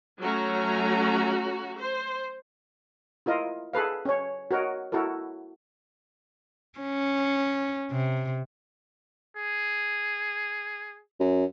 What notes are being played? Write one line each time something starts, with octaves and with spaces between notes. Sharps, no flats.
F#3 A3 C#4 F#4 A#5
C5
E4 F4 A#4 D#5
G#4 A4 B4 F5
C#4 C#5
F#4 A#4 C#5 D#5
E4 F#4 A4 A#4
C#4
C3
G#4
F#2